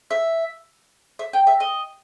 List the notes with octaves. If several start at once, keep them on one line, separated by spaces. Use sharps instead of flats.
E5
E5
G5
E5
D#5